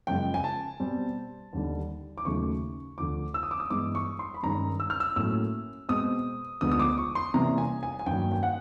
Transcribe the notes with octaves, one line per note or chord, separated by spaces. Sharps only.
F#2 C#3 F3 G#3 G5
G#5
A5
B2 G3 C4
D#2 D3 G3
D6
D#2 C#3 F#3 A3 C#6
D2 D3 F3 D6
E6
D#6
D6
D#6
G2 E3 G#3 B3 D6
C#6
C6
B5
G2 D#3 G#3 C#4 A#5
E6
F6
E6
A2 F#3 A#3 C#4 E6
B2 G#3 C4 D#6
D2 D3 F3 G#3 B3 D#6
D#6
D6
C#6
C6
C3 E3 G3 A#3 C#4 A#5
G#5
G#5
G#5
G2 D#3 F#3 A#3 C#4 G5
G5
F#5